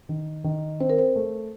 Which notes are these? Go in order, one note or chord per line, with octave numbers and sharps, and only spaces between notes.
D#3
D#3
C4 C5
A#4
C5
A3